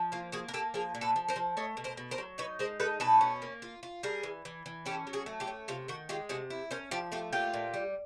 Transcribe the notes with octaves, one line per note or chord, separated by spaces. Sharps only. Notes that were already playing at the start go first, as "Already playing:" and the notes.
Already playing: F3
A#3 F4
A#3 F#4 G#4
A#4
A#3 G4 A4
F3 G#4 A#4
A#2
A4 B4
F3
A#4 C5
F3
A3 C#5 D#5
B2
A#4 C5
B2
A#4 C5
F#3
D#4 B4 C#5
G#3 A#4 C5
D#4 A4 B4
B2 A4 B4
C#4
A#3
F4
F4
G3 G#4 A#4
E3
E3
E3
C#4 G4 A4
F#3
F#4 G#4
A3
F4 G4
C#4
C3 F4
D#3 F#4
G#3 F4 G4
C3 F#4 G#4
E4
C#4 A#4 C5
F3 F4 G4
A3 F4 G4
A#2 F4 G4
A#2
G3